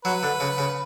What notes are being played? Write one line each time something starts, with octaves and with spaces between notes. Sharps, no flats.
F#3 B4
D3
C#3
C#3